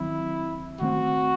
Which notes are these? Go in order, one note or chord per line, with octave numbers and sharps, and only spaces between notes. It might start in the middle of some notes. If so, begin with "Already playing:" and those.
Already playing: D#3 F#3 C4 E4
D#3 A3 C4 F#4